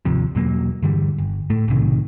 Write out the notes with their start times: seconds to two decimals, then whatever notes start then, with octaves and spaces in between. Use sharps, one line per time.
0.05 G#1 D#2 C3 F3
0.35 E2 B2 F#3 A#3
0.82 G2 D3 E3 G3
1.18 G1
1.50 A2 A3
1.68 B1 A2 C3 D#3